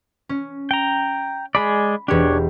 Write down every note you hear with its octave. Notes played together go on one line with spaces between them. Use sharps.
C#4
G5 A#5
G#3 G#4 D5 B5
E1 D4 G4 C#5